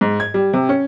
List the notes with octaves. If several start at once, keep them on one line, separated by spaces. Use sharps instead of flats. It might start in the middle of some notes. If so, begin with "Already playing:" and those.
G#2
G#6
G3
C3
C#4